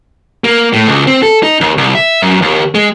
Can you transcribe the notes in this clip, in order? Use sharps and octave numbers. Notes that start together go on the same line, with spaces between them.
A#3
A2
C#2
C4
A4
D#4
D#2
C2
E5
F#2
D#2
G#3